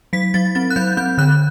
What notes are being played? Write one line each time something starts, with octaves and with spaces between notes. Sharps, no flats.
F#3 B6
F#3 A6
C4 A6
F#6
F#3 G6
C4 G6
D3 F#6